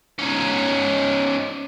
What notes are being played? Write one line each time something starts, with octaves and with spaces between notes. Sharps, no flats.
C#4 D#4